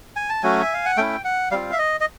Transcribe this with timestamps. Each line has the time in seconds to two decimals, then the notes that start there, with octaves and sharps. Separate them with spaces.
0.16 G#5
0.29 A5
0.43 F#3 A3 C#4 F#4 G#5
0.62 E5
0.74 F5
0.85 F#5
0.97 A3 C#4 E4 G5
1.24 F#5
1.51 G3 C4 F4 F5
1.72 E5
1.78 D#5
2.00 D#5